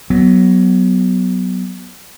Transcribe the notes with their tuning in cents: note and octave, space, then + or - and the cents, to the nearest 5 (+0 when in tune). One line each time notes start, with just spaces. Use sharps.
F#3 +10 B3 +0